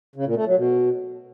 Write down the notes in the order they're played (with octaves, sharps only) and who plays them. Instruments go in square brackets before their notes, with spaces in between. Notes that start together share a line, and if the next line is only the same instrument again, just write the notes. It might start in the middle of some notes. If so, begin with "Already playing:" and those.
[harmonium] C#3
A#2
A3
F#3
B2